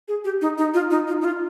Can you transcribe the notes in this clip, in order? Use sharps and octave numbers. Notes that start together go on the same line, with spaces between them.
G#4
G4
D#4
D#4
F4
D#4
F4
D#4
F4